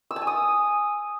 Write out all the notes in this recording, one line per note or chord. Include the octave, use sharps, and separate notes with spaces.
E6
A5
G#5
D#6